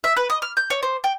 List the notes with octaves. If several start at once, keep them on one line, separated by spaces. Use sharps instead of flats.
E5
B4
D#5
F6
G6
C#5
C5
G5